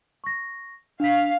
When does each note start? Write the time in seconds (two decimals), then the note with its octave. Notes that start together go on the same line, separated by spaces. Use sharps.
0.24 C#6 A#6
1.00 D4 F5 B6